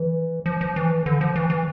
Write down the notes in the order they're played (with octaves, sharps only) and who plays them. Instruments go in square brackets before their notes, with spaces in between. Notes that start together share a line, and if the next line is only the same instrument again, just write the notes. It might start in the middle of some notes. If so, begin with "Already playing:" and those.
Already playing: [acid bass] E3
F3
F3
E3
D3
F3
E3
E3